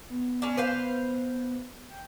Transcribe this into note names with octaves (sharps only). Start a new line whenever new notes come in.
B3
C#4 D4
B4 C5 F5
G5